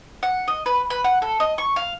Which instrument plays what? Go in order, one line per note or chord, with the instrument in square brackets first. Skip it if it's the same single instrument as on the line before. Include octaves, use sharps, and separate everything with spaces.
[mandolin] F#5
D#5
B4
B4
F#5
A4
D#5
C#6
F5